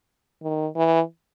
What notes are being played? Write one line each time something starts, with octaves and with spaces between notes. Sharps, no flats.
D#3
E3